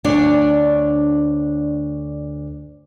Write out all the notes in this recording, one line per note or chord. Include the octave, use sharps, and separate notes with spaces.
D2 D4 C#5